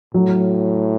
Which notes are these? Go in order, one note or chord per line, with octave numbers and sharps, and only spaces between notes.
A2 F#3